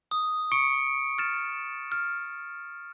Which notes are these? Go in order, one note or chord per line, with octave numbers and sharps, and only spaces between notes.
D#6
C#6 C#7 D7
F6 A6 E7
F6